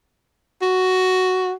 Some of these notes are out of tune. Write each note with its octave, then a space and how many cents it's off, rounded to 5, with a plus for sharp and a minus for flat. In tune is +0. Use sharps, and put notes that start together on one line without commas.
F#4 +5